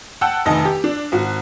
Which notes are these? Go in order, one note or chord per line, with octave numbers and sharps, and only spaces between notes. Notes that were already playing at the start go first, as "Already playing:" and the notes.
F#5 G5 A5 E6
F1 D2 D#3 D#5 A5
G4
D4
G#1 F#4